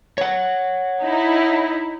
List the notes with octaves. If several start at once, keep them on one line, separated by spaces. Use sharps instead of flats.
C#5 F#5
D#4 E4